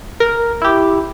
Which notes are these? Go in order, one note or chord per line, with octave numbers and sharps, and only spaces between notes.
A#4
E4 G4